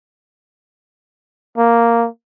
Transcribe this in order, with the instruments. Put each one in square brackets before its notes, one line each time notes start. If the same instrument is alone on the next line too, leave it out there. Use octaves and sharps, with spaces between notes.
[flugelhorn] A#3